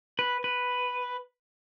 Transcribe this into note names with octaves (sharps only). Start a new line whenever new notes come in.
B4
B4